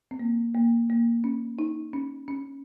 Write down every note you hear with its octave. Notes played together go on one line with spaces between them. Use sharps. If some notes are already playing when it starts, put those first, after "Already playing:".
C4
A#3
A#3
A#3
C#4
D#4
C#4
C#4